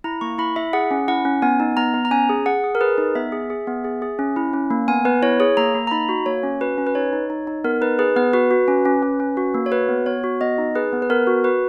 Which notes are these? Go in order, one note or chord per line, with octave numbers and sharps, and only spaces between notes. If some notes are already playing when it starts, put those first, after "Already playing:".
E4 A#5
A#3 C#6
E4 B5
E4 E5
G#4 F#5
C#4
E4 F#5
C#4
B3 G#5
D#4
B3 A#5
B3
A#5
C#4 G#5
G#4
G#4 F#5
G#4
A#4
G#4 B4
D#4
B3 E5
G#4
G#4
B3
G#4
G#4
C#4
E4
C#4
A#3
B3 G#5
B3 B4
E4 C#5
G#4 C#5
A#3 A#5
A#3
A#5
D#4 B5
F#4
A#3 C#5
C#4
F#4 B4
C#4
B4
D#4 C#5
D#4
D#4
D#4
B3 A#4
D#4 B4
G#4 B4
B3 B4
F#4 B4
F#4
C#4
C#4
C#4
C#4
F#4
A#3
C#5
F#4 B4
B3
B3 C#5
F#4
B3 D#5
D#4
G#4 B4
B3
B4
B3 A#4
F#4
F#4 B4